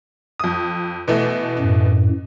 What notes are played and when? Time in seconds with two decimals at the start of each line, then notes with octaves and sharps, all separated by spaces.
0.40 F2 D#6
1.08 B2 E3 A3
1.59 F#2 A2